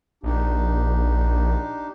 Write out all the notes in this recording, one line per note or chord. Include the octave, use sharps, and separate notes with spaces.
A#1 D4 D#4 G4